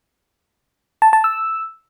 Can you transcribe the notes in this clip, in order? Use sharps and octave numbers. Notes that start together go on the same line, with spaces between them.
A5
A5
E6